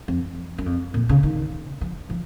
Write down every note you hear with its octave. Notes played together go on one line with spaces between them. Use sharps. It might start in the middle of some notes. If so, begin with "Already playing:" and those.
F2
F#2
F2
A#2
C#3
D#3
F3
F3